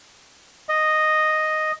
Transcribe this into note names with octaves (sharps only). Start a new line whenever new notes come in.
D#5